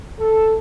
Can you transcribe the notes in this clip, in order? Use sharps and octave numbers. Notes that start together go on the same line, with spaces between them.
A4